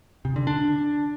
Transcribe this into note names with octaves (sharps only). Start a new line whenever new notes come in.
C3
D3
D4